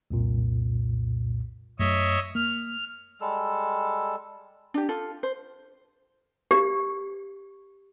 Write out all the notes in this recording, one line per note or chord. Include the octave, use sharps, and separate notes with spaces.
C2 F2 A#2
F#2 A3 C#5 D#5 E5
A#3 F6
G3 G#3 A4 E6
D4 G4
F4 A4
C5
G4